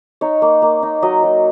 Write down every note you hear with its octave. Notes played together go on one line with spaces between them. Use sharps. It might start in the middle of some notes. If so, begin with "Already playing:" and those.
D#4 C#5
A#3
A#3
D#4
F#3 D#5
F#3